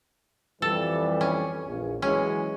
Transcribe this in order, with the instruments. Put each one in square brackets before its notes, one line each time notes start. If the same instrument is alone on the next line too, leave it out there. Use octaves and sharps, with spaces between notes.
[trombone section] F2 E3 G3 [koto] A4
[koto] C#4
[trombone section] A#1 E2
[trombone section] E3 F#3 G#3 [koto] C#4